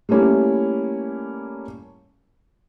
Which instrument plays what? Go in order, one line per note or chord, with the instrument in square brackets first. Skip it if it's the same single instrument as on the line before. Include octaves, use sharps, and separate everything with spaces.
[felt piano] G3 A3 A#3 C#4 E4